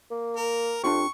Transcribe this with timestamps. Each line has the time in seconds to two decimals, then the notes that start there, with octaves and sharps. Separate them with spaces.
0.11 A#3
0.36 A#4
0.83 F2 D4 F4 G4 C#6